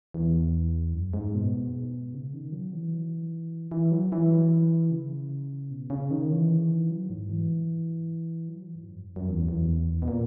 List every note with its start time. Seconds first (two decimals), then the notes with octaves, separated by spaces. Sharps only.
0.14 E2
0.94 F#2
1.13 G#2
1.34 B2
2.14 C#3
2.34 D#3
2.52 F#3
2.72 E3
3.72 E3
3.92 F#3
4.12 E3
4.91 C#3
5.71 B2
5.90 C#3
6.10 D#3
6.30 E3
6.90 F#3
7.10 G#2
7.29 E3
8.49 F#3
8.62 E3
8.75 G#2
8.88 F#2
9.16 F#2
9.29 E2
9.49 E2
10.02 B2
10.08 A#2